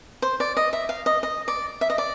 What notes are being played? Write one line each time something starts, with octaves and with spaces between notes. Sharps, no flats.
C5
D5
D#5
E5
F5
D#5
D#5
D5
E5
D#5
D5